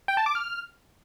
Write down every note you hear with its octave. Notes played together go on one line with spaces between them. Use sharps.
G5
A5
D6
F6